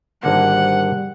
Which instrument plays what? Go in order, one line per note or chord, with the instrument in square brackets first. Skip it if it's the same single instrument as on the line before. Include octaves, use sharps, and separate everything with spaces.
[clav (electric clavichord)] G#1 D3 A#3 [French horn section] G3 [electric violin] F#5